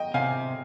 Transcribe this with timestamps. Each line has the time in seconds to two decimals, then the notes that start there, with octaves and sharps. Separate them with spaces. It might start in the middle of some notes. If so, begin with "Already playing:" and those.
Already playing: D#5 G5
0.14 C3 F5 G#5